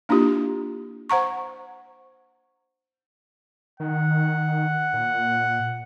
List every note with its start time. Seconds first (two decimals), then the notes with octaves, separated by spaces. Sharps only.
0.09 A#3 D4 E4 F4 G4
1.10 C5 F#5 A#5 C#6
3.80 D#3 F#5
4.93 A#2